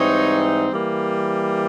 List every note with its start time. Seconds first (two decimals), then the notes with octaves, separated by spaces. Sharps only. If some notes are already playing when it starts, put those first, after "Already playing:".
Already playing: G#2 E3 G3 C4 D#4 C#5
0.72 E3 G3 A#3